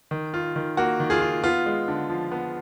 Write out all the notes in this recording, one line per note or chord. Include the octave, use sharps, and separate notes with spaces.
D#3
F4
D#3
A#3 F#4
D#3
F4 G#4
F4
B3 F4
G#3
D3
F3
B3